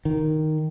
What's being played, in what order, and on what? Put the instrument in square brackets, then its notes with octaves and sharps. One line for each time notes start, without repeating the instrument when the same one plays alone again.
[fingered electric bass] D#3